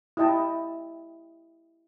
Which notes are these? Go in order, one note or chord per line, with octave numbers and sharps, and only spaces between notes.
E4 G4 D#5 G5 A5